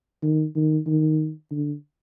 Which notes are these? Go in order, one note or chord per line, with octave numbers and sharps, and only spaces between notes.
D#3
D#3
D#3
D3